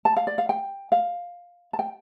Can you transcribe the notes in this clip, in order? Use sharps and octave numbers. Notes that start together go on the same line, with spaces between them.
A5
F5
D5
F5
G5
F5
A5
G5